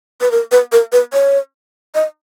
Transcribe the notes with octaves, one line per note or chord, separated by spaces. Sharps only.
B4
A#4
B4
A#4
B4
C#5
D#5